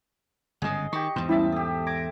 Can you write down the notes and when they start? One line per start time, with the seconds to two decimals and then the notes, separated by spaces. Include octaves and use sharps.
0.62 G1 G#2 C#3 G#4 D#5
0.93 D#3 G4 C#6
1.16 E2 G#2 C5
1.29 G3 C#4 E4 G4 E5 A5
1.52 G4 A4 D#6
1.87 D6 G#6 A#6 D7